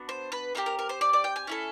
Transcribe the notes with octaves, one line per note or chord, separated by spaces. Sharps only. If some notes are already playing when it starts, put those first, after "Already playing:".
Already playing: B3 D4 F#4
C5
B4
C4 D#4 G4 A#4
A#4
A#4
C5
D5
D5
G5
G#5
C#4 E4 A4